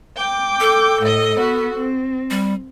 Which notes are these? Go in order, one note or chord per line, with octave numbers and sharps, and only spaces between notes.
G5 D6
A4
A2 D#5
B3 F#4
C4
G3